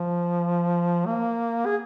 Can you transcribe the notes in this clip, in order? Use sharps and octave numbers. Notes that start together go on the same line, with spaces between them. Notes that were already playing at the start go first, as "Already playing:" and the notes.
Already playing: F3
A#3
G#4